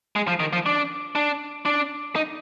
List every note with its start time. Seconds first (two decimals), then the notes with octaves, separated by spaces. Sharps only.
0.16 G#3
0.28 F3
0.40 D#3
0.53 F3
0.66 D4
1.15 D4
1.66 D4
2.16 D#4